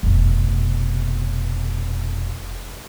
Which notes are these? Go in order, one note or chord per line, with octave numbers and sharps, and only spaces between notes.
F1 B2